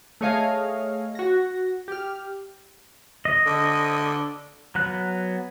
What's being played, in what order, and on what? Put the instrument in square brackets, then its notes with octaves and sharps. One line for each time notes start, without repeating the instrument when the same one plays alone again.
[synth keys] A3 G#4 C#5 D#5 F5
F#4 A#6
G4 F6
[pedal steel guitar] D#5
[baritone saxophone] D3
[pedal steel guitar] F#3 B3 F#6